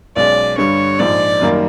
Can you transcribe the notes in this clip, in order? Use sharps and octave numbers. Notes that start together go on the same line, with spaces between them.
B1 B2 G#3 C#4 D5
G2 D3 G3 C#5
A#1 G#2 F3 D5
F#2 D#3 G3 A#3